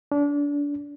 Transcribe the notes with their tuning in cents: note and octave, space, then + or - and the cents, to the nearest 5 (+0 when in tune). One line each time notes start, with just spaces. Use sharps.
D4 -30